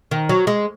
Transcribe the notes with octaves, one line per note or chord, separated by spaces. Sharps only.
D#3
F#3
G#3